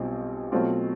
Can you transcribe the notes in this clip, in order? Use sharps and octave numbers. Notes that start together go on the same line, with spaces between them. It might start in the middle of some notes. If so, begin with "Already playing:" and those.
Already playing: B1 B2 G3 C4 F4
B2 F#3 A3 C4 F4